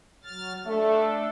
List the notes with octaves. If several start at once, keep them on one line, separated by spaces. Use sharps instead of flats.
F#3 F6 A6
A3 D4 A4